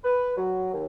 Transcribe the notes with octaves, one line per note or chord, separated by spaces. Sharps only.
B4
F#3
D#2